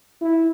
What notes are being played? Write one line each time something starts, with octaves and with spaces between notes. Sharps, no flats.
E4